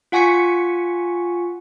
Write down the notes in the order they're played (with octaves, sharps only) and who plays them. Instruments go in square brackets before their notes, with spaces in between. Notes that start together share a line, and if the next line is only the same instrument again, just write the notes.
[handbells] F4 F#5 G#5 C#6 B6 C#7